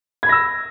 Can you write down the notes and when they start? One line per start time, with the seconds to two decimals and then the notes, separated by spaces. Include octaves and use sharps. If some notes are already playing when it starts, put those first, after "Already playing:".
0.23 G#6
0.26 B5
0.29 A#6
0.32 E6